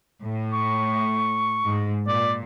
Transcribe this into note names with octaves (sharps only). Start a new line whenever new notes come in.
A2
C#6
G#2
A#2 D5